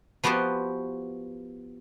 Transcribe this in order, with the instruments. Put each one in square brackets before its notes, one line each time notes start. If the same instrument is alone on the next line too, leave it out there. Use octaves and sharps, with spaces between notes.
[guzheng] F3 B3 F#4 G4 C5